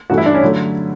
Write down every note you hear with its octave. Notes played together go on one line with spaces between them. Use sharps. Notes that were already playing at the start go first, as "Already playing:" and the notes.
G2 E3 A3 F#4
E4
D4
C#4
D3 F#3 A3